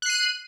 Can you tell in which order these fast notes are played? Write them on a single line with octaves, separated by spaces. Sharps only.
F#6 C7 D#7